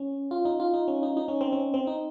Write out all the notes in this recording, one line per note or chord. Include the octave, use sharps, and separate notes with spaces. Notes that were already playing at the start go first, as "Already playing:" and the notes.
Already playing: C#4
F4
D#4
F4
D#4
C#4
D#4
D#4
C#4
C4
C#4
C4
D#4